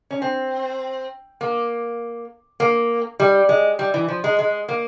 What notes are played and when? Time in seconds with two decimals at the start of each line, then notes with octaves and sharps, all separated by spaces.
0.11 C#4
0.22 C4
1.41 A#3
2.60 A#3
3.20 G3
3.49 G#3
3.79 G3
3.94 E3
4.08 F3
4.24 G#3
4.39 G#3
4.68 A#3